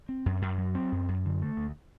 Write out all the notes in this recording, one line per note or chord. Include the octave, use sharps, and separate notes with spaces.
C4
F#2
F#2
F#3
C4
F#2
F#2
D3
A3
D2